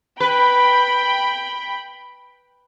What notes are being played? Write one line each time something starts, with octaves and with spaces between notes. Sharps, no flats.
B4 G5 B5